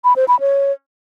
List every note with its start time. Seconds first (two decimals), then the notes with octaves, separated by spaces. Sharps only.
0.04 B5
0.16 C5
0.28 B5
0.40 C#5